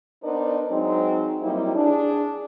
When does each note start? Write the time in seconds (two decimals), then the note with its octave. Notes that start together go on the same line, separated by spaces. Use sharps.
0.23 B3 D4 D#4 A#4 C5 D5
0.70 F#3 G#3 C4 D#4
1.42 F#3 G3 A#3 C4 D#4 E4
1.75 D4 G#4